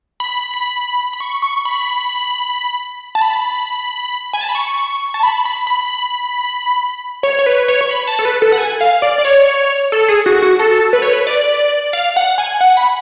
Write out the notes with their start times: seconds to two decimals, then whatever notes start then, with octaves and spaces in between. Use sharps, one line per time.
0.20 B5
0.54 B5
1.13 B5
1.20 C#6
1.42 C#6
1.65 B5
3.15 A5
3.22 B5
4.33 G#5
4.41 A5
4.49 B5
4.55 C#6
5.14 A5
5.23 B5
5.45 B5
5.67 B5
7.23 C#5
7.39 C#5
7.46 B4
7.68 C#5
7.81 C#6
7.91 B5
8.07 A5
8.19 A4
8.25 B4
8.42 A4
8.52 F#5
8.58 G#5
8.81 F5
9.02 D5
9.18 D5
9.25 C#5
9.92 A4
10.08 G#4
10.26 F#4
10.42 F#4
10.59 A4
10.93 B4
11.02 C#5
11.13 B4
11.27 D5
11.93 F5
12.16 F#5
12.38 G#5
12.61 F#5
12.77 B5